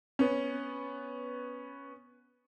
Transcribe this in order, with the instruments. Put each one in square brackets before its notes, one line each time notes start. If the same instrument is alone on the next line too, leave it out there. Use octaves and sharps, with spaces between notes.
[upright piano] B3 C#4